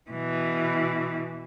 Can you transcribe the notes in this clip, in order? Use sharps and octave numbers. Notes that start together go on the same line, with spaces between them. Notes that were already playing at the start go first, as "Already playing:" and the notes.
B2 E3